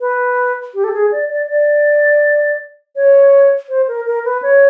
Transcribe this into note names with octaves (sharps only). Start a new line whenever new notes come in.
B4
G4
A4
G#4
D5
D5
D5
C#5
C5
A#4
A#4
B4
C#5